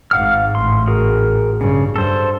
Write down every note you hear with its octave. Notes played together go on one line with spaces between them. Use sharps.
G#1 G#2 F5 F#5 F6
A1 C6
F#4 G#4 A#4
G2 C#3
G2 A4 C5